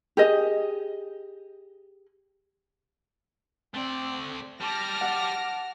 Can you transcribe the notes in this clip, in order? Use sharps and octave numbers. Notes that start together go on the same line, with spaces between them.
G4 G#4 D#5
A3 C4 D5
G3 A5 D6 F6 A#6
F#5